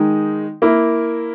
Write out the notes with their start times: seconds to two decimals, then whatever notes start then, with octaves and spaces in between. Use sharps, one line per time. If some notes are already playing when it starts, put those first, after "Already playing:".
Already playing: D#3 G#3 D#4
0.62 A#3 E4 A#4